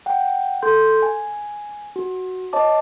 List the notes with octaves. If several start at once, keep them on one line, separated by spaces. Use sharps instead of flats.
F#5 G5
A4 C6 G6
G#5
F#4
C#5 D#5 A5 D6